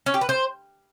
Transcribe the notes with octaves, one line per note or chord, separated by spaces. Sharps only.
C#4
G4
B4
C5